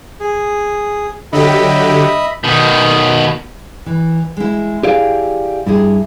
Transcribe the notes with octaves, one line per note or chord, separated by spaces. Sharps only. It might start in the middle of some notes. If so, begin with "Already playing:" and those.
G#4
D3 F#3 G4 D#5 E5 B5
B2 D#3
E3
G#3 E4
E4 G4 G#4 D5 F5
G2 E4 G4 G#4